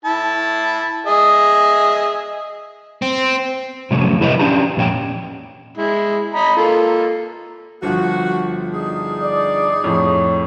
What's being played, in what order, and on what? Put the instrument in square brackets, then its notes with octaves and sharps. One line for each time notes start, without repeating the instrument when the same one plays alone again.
[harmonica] E4 A5
G#4 D#5 E5
[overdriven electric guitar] C4
[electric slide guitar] F2 A2 C3 F#3 C#4
E4 G4 B4 C#5 D#5
C#4 D4 G4 A#5
F2 A#2 C#4 G5
[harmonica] G#3 E4
D#5 A#5 B5
A#3 F4 A4
[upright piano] G1 F3 [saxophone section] F#4
[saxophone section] D4 D#4 G#4
[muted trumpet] D5
[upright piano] F2 A2 [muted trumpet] C#5